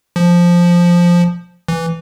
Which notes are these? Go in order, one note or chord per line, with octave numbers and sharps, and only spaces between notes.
F3
E3